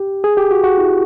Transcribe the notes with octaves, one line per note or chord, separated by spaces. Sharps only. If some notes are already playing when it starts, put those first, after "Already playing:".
Already playing: G4
G#4
G4
F#4
F#4
E4